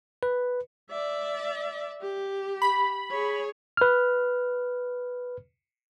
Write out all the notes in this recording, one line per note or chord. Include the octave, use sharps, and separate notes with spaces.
B4
D5 E5
G4
B5
G#4 C#5
B4 F6